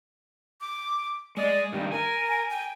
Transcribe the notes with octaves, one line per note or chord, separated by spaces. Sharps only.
D6
G#3 D5 D#5
G2 D#3 G4
A#4 G#5
G5